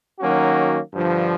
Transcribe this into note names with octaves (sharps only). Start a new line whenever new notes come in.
D#3 F#3 A#3 C#4 F#4
G2 D3 F3